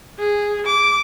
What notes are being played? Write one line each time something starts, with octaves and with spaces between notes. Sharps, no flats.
G#4
D6